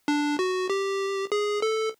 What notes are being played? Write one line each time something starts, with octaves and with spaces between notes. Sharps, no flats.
D4
F#4
G4
G#4
A4